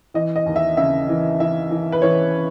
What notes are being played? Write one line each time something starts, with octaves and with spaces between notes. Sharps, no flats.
E3 D#5
D#5
D#2
E5
C#3 E5
E3
E3 E5
E3
B4
E3 C#5